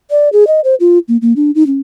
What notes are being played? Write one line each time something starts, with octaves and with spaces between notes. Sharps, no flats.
D5
G#4
D#5
C5
F4
A#3
A#3
D4
D#4
C#4